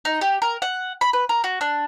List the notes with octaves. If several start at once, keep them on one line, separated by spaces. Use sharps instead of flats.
D#4
G4
A#4
F#5
B5
B4
A#4
F#4
D4